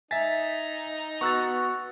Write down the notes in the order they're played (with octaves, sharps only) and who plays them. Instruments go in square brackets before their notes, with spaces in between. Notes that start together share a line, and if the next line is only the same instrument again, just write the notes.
[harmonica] D#4 [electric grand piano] E5 G#5 [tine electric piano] A6 B6
[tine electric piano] B3 F#6 [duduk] F#4 [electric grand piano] C#6 E6 A6